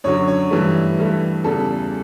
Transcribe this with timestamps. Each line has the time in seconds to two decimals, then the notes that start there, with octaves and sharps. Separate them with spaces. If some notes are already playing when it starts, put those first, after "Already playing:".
0.04 F#2 D3 F#3 C#5
0.28 C#5
0.51 G2 E3 A3
0.98 G2 E3 A3
1.44 E2 C#3 G3 A4